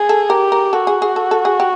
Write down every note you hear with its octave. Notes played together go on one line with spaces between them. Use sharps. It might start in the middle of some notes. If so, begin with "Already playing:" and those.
Already playing: G#4
A4
G4 A#4
A#4
F#4 A4
G#4
G#4
A4
A4
G#4
G4